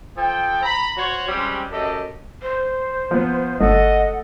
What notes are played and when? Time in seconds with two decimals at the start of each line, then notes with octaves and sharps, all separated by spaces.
0.17 F3 A4 G5
0.63 A#5 B5
0.97 F#4 C5 C#5
1.28 G3 G#3 C4 C#4 G4
1.71 F#2 G4 A4 D#5
2.42 C5
3.11 F3 B3
3.61 G1 A3 D#5 F#5